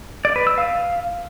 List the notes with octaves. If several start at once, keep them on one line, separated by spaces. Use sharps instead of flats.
D5
B4
E6
F5